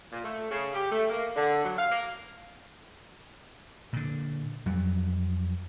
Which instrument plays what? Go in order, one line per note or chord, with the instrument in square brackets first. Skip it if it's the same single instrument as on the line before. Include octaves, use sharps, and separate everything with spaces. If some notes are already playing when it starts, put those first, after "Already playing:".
[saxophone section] A#2
A3
C#3
G4
A3
A#3
D3
F#3
F5
A#3
[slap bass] A#2 D3
F2 F#3 G3